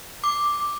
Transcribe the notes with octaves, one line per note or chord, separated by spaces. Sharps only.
D6